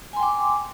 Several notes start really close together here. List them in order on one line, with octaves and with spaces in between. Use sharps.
G#5 C6 G5 D6